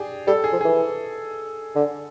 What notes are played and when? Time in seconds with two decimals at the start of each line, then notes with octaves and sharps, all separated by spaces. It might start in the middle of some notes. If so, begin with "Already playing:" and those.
Already playing: D4 G4 G#4
0.27 G3 A4
0.44 G#4
0.52 F3
0.61 E3 G#4
1.75 D3